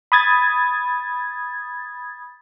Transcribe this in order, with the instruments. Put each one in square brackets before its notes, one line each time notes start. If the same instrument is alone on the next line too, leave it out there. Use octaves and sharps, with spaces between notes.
[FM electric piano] B5 D#6 G#6 A6